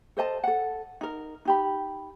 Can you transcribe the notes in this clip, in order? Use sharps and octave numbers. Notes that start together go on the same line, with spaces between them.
A4 C5 D#5 A5
A4 F#5
D#4 A#4
D#4 G4 B5